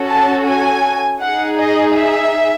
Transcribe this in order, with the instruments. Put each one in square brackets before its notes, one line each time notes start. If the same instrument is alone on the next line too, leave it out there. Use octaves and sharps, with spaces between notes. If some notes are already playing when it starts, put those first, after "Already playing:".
Already playing: [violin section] C#4 F#4 A4
A5
G#5
D#4 G#4 F#5
D#5
E5